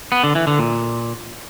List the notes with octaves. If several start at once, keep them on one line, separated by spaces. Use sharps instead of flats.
B3
D3
E3
D3
A#2